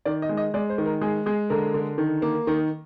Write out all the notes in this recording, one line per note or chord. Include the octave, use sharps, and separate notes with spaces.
D#3 D5
D#5
G#3
D#5
G#3 D5
C5
D#3
A#4
G#3 G#4
G#3 G#4
D3 A#4
D3
D#3
A#3
D#3